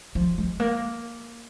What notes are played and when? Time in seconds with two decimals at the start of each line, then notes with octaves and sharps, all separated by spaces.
0.15 F3
0.38 G#3
0.60 A#3